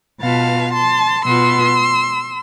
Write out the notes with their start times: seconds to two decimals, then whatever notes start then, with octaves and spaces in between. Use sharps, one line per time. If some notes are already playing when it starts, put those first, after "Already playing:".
0.20 B2 B3 F4 F5 A5
0.72 A5 C6
1.25 B2 B3 F4 C6 E6